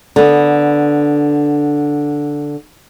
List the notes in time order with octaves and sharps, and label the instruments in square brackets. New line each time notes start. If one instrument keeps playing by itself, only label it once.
[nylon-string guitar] D3 B3